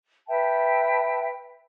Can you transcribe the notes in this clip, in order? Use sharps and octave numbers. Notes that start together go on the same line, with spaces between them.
B4 E5 G5 A5